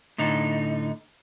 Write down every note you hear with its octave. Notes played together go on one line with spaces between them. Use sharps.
A2 D3 D#4